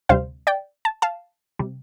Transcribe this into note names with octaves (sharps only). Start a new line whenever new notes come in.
D2 C3 G3 C5 F5
D5 G5
A5
F5 A5
C3 G3